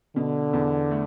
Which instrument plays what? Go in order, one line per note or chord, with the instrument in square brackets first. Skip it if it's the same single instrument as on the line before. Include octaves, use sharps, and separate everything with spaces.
[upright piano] B2 [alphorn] D3
[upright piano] E2
A3